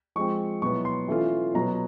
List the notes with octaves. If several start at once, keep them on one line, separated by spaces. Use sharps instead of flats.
F3 G#3 C4 C#6
B2 F#3 B3 E4 C#6
C6
E3 A3 C#4 F4
B2 F#3 B3 A#5